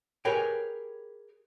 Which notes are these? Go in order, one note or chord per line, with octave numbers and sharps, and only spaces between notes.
G4 G#4 A#4 B4 C#5 G5